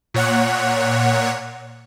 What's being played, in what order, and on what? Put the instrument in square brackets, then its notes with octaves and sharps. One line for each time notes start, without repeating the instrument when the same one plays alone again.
[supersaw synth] A#2 C#5 F#5